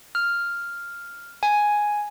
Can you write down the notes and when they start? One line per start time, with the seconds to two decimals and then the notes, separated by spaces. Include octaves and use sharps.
0.15 F6
1.43 G#5